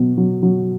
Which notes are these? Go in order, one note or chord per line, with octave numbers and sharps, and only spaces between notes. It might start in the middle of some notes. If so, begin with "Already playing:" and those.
Already playing: B2 F#3
F#3
F#3